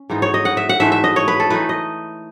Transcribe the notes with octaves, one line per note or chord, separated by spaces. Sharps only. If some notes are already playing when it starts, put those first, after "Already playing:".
Already playing: C#4
G#2 E3 B3 D#4
C#5
D#5
F#5
E5
F#5
G#2 E3 A3 E5
E5
D#5
C#5
B4
A4
E3 A3 D#4 B4
D#5